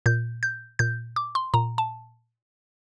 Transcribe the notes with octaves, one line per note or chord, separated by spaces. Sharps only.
A#2 G6
G6
A#2 G6
D6
C6
A#2 A#5
A5